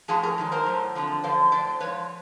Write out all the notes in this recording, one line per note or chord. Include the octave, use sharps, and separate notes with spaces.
A2 F3 F#4 G#4
G#4 A#4
G#2 D#3 F#3
A#4 C5
A2 F#3
F2 D3 F3
F#2 D3 F3 C5 D5
A2 F#3 C5 D5
G#2 F3 B4 C#5